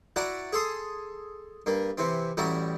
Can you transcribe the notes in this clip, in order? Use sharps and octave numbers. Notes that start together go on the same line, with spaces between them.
E4 F#4 D5 F#5 A#5
G#4 A4 C6 D#6
G2 A#3
C3 E3 C4
A1 G3 E4 F#4 A#5